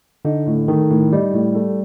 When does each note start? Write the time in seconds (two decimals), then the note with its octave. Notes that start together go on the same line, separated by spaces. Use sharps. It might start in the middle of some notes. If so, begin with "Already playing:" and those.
0.25 D3 D#4
0.46 A2
0.68 D#3 A3
0.90 A2
1.12 G3 D#4
1.33 A2
1.55 A3